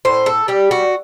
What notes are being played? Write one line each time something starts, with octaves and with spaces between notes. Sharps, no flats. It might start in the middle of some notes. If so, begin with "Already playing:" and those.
A2 C5
A4
G3 G4
F#4